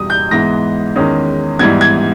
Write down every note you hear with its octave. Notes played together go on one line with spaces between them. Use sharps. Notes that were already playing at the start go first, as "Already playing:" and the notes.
Already playing: E2 B2 G3 D#6
G6
G#2 E3 G#3 B3 A#6
E2 D#3 G#3 C#4
G#2 E3 G3 B3 G#6
G#6